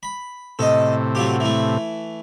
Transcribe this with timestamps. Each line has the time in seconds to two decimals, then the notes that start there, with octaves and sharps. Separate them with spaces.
0.03 B5
0.59 A2 C3 A4 D#5
1.15 F#3 F4 G4
1.40 E3 A3